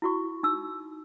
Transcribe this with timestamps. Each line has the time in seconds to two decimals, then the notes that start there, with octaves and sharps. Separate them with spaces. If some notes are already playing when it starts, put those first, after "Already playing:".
0.02 E4 F#4 C#6
0.43 D#4 E6